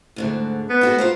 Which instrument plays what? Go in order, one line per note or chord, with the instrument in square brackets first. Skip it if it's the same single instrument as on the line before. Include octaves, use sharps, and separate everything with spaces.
[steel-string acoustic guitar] D2 G#2 D3
[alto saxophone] B3
[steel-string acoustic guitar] D4 F#4 A4
F4 A#4 C5